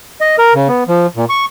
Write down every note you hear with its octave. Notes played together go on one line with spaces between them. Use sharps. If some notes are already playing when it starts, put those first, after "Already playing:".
D#5
A#4
C#3
B3
F3
A#2
C#6